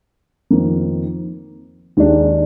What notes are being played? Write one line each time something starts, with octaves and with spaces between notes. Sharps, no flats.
F2 D#3 A#3
D#2 D#3 G#3 D4